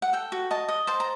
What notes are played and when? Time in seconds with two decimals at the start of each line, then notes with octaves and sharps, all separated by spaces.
0.02 F#5
0.13 A4 G5
0.32 F#4
0.51 D#5 A5
0.69 D#5
0.87 C5 A5
1.00 A#5